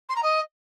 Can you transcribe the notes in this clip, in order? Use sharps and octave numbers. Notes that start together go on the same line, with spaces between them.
C6
A#5
D#5